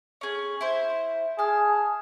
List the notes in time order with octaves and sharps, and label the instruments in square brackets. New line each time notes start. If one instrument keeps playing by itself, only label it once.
[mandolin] C#4 G#4
E4 C5
[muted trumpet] G#4 [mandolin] A5 F6